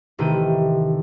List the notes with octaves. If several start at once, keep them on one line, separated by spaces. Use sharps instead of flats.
A1 C3 D#3 E4 G5 D#7